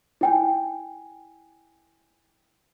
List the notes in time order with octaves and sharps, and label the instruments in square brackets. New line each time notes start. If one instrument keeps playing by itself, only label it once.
[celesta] E4 G5 G#5